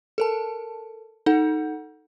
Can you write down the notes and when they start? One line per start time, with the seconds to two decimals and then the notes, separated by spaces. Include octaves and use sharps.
0.18 A4 A#4 A5
1.26 D#4 A4 F#5